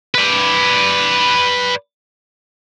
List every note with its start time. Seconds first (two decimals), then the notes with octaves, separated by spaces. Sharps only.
0.15 B4 D5